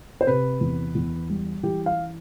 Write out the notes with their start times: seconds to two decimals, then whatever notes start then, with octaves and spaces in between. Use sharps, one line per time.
0.21 C5
0.27 C3 B4
0.61 E2
0.95 E2
1.30 G3
1.63 E3 G4
1.86 F5